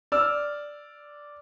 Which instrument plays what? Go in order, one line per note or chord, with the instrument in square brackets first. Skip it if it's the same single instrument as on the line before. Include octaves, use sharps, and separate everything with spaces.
[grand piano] D5 E6 F6